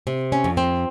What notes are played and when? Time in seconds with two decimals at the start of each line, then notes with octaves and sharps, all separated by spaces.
0.07 C3
0.32 C#4
0.44 F2
0.57 C4